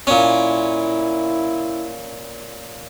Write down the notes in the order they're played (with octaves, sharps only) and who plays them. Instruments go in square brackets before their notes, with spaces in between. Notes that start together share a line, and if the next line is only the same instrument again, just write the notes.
[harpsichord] A#2 C#4 [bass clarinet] E4